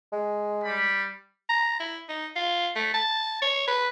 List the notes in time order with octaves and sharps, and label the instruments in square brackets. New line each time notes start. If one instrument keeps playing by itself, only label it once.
[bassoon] G#3
[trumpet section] G3 D5 B5
[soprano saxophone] A#5
E4
D#4
F4
A3
A5
C#5
B4